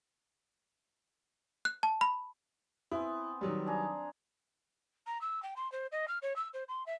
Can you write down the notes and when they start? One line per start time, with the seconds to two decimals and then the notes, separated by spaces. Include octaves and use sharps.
1.65 F#6
1.83 A5
2.01 B5
2.91 B3 C4 E4 G#5
3.41 D#3 F#3 G3
3.66 D4 G#4 A#5
5.06 A#5
5.21 E6
5.42 G5
5.56 C6
5.71 C5
5.91 D#5
6.07 F6
6.22 C#5
6.35 E6
6.53 C5
6.68 C6
6.86 E5